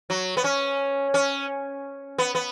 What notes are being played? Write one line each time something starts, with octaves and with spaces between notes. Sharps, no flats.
F#3
B3
C#4
C#4
B3
B3